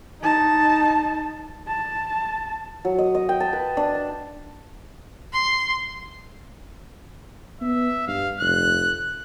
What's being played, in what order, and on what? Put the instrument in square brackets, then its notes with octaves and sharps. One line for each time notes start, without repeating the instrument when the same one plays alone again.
[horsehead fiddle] D#4 A5
A5
[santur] F#3
D#5
D#5
G5
A5
B4
D4
A5
[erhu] C6
[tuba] B3 [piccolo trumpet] E5
[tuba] G2 [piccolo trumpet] F5
[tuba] F1 [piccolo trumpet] F#6